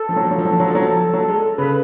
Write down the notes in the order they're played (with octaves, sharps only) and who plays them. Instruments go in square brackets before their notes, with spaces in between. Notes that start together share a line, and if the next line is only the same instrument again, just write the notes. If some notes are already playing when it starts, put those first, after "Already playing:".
Already playing: [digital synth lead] A4
[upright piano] F3
F#3
F3
F#3
F3
F#3
F3
F#3
F3
F#3
F3
F#3
G#3
[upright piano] C#3 [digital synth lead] B4